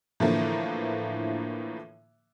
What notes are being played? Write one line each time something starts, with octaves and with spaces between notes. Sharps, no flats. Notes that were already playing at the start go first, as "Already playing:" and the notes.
A2 D3 E3 F3 A#3